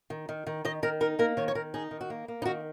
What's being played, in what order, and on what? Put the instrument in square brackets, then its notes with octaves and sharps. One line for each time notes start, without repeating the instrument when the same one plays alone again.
[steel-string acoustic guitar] D#3
D#3
D#3
D#3 D#5
D#3 A#4
D#4 A#4
A#3 A#4
D#3 C#5
C#5
D#3 A#4
D#4 G#4
D#3
F#4
A#3
A#3
D#4
D#3 F#4